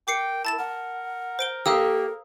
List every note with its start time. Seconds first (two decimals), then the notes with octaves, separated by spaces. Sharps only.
0.08 A#4 G5 D6 C7 C#7
0.45 E4 A5 A6 E7
0.58 A#4 F#5
1.39 C5 D7 G7
1.66 A#3 G4 A4 F5 D#6 E6